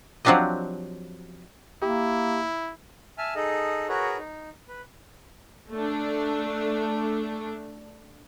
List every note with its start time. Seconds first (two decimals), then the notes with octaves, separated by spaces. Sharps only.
0.25 F3 F#3 C4 D4 G4 D#5
1.82 A#3 E4 G4
3.18 E5 G#5 A5 F6
3.36 D#4 G#4 A4 D#5
3.89 F#4 G#4 A#4 B4 C#5
4.18 D#4
4.68 B4
5.72 A3 D4